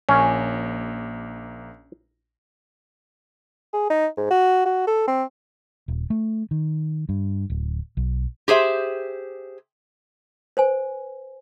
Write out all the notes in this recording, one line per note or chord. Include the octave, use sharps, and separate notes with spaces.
A#1 A#3 C#4
G#4
D#4
G#2
F#4
F#4
A4
C4
D#1
A3
D#3
G2
D1
B1
G4 G#4 C5 E5
B4 C5 G#5